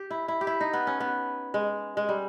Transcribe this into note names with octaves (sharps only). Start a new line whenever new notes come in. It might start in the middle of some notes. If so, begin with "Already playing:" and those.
Already playing: G4
E4
E4
G4
E4
D#4
B3
C#4
B3
G#3
G#3
G3